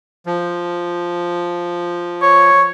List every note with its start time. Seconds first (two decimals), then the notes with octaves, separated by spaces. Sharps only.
0.26 F3
2.22 C#5